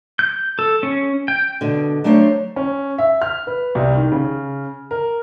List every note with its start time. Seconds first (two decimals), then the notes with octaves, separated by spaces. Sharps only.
0.19 G6
0.59 A4
0.83 C#4
1.28 G5
1.61 B2 D3
2.04 F#3 A3 D4 C5 C#5
2.56 C#4
2.98 E5
3.22 F6
3.47 B4
3.75 C2
3.95 D#3
4.12 C#3
4.91 A#4